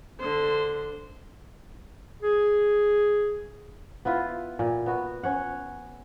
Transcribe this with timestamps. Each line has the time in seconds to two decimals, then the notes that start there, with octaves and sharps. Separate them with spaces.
0.20 D3 C5
2.22 G#4
4.05 B3 E4 F4 B4
4.59 A#2
4.86 B3 F#4
5.23 C#4 C#5 F#5